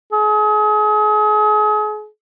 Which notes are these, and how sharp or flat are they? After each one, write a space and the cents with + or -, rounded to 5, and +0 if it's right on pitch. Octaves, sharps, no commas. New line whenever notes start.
G#4 +35